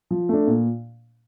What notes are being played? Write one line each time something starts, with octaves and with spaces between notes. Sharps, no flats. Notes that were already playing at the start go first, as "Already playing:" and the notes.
F3
A3 D4
A#2